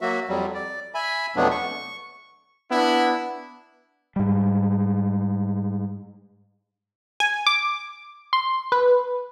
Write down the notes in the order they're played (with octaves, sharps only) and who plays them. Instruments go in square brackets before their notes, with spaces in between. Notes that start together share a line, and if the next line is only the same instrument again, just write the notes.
[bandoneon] F#3 A#3 F#4 E5
F2 F#3 G3
D5
E5 G#5 B5
F2 B2 F#3 A3 B3 D4
C#6
[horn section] B3 D4 E4
[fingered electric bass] G#2 G3
[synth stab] G#5
D6
C6
B4